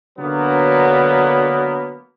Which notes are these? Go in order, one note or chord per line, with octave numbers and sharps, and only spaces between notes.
D3 F#3 A#3 B3